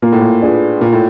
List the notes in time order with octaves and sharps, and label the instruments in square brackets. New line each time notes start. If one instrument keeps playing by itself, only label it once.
[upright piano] A#2 [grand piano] A#3
[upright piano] A2
A#2
[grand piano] D4 F4 G#4 B4
[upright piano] A#2 [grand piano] A#3
[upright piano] A2